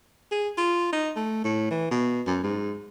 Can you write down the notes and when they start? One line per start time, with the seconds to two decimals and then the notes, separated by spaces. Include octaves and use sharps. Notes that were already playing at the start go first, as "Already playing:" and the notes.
0.32 G#4
0.58 F4
0.93 D#4
1.16 A3
1.44 A2
1.71 E3
1.91 B2
2.27 F#2
2.43 G#2